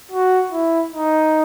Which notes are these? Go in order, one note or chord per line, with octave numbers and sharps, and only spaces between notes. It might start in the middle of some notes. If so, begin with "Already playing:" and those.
F#4
E4
D#4